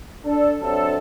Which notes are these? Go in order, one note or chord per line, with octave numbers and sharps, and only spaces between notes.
D4 A4
C3 F#3 D4 A4